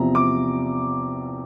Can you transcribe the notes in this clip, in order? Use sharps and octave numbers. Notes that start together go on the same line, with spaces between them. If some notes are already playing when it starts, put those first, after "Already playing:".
Already playing: E2 C3 F3 A#5
D6